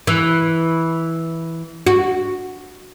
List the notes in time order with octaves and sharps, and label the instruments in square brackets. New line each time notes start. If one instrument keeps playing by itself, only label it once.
[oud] E3
F#4